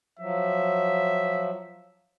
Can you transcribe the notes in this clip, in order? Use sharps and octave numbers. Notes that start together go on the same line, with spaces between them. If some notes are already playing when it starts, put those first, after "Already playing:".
F3 F#3 E5